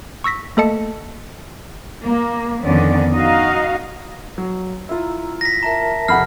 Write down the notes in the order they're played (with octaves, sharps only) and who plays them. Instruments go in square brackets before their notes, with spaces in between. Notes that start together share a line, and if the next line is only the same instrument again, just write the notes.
[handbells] C#6 E6 A#6 B6
A3 A#3 A4 D#5 A5 C#7
[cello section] A#3
F2 D3 D#3 B3 C#4 D5
D#4 F#4 D#5 F5
[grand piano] F#3
[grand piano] E4 F4 [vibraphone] A#5 E6
[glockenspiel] A#6 B6
[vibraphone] A#4 E5 A5 [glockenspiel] A#5
[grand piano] F2 C3 [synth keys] F#5 B5 C7 [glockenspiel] F6